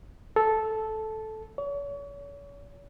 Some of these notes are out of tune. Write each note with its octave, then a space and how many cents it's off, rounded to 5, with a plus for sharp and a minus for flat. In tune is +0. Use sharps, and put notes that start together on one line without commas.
A4 -10
C#5 +40